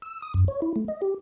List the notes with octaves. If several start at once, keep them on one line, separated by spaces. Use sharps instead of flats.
E6
D#6
F#2
C#5
E4
A3
D#5
G4